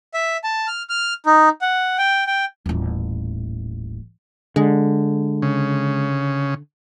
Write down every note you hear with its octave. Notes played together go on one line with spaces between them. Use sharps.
E5
A5
F6
F6
D#4
F#5
G5
G5
D#1 A1
D3 G#3
C#3